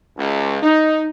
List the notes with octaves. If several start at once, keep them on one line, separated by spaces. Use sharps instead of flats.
C#2
D#4